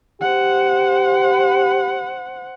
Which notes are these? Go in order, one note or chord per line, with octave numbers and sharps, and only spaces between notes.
G4 C5 F#5